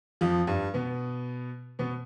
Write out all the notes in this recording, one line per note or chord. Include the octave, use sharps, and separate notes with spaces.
F2 F3
G2 G3
B2 B3
B2 B3